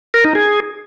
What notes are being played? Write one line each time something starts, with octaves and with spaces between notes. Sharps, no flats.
A#4
D#4
G#4